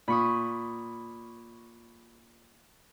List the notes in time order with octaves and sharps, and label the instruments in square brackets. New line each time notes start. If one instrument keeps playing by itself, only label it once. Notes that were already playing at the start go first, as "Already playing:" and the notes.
[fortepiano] A#2 [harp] B5 C#6 D#6